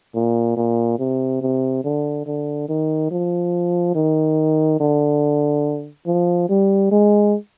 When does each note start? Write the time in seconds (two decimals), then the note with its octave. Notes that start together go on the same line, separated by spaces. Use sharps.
0.15 A#2
0.57 A#2
0.99 C3
1.42 C3
1.84 D3
2.26 D3
2.69 D#3
3.11 F3
3.95 D#3
4.80 D3
6.06 F3
6.49 G3
6.91 G#3